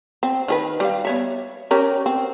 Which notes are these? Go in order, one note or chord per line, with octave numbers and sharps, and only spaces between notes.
C4
D#3 G#4 B4
G3 F5
B3 C#5 E5
C#4 G4 A#4
C4